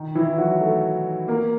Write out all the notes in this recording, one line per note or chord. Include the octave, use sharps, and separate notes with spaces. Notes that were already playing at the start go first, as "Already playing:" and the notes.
Already playing: D#3 D#4
E3 E4
F#3 F#4
A3 A4
A#3 A#4